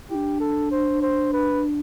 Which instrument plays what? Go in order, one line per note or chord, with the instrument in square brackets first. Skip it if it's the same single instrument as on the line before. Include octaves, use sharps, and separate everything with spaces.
[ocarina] D4 E4 [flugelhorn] G4
[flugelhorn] A4
C5
C5
B4